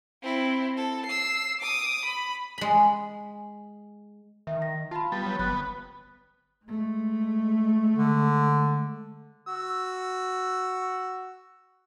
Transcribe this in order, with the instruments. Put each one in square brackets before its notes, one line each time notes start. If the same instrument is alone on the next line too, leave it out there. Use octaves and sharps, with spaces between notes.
[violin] C4 E4
A4
E6 C7
D6 D#6
B5
[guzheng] G#3 B5
[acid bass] D#3 [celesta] E5
[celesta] A#6
[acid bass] F4 [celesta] A5 B5
[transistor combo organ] G3 B3 [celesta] A6
[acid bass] F#3
[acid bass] G1 [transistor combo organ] B3 [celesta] F#6
[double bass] G#3 A3
[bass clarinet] D3
[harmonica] F#4 E6